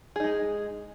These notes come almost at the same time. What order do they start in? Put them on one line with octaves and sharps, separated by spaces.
G#4 D#4 G#3